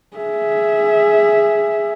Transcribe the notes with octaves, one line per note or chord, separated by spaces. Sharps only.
G#4 E5